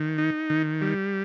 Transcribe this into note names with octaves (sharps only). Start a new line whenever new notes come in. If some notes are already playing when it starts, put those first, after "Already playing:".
Already playing: D#3
D#4
D#3
G3